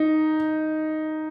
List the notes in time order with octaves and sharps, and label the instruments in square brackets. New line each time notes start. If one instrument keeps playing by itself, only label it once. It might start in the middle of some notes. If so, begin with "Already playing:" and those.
Already playing: [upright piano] D#4